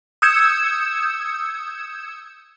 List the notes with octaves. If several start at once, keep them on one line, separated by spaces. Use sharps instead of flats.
D#6 E6 G6 G#6 C#7 E7